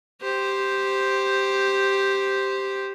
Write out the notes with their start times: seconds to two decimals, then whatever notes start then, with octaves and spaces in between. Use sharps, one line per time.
0.22 G4 C5